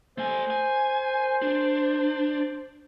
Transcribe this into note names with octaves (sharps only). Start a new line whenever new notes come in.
A3 C5 G#5
G#5
D4